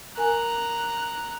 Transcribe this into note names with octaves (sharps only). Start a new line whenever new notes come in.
A#4 G#5 A#5 F#6